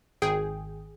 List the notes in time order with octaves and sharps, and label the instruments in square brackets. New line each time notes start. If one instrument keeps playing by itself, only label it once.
[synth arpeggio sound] G#1 G#4 G5